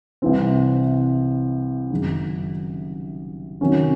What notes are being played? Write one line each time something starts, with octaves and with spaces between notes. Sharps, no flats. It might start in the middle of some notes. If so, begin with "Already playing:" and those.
C2 C3 E3 C4
F#1 F#2 D#3 G#3 D#4
C3 D#3 F#3 C#4